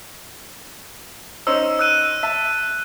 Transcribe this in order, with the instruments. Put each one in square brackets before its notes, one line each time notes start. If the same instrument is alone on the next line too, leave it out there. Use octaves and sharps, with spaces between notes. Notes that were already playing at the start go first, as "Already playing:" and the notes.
[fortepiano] C#4 D#4 C5 [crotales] E6
[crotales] E6 F#6 D#7
[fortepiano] E5 A5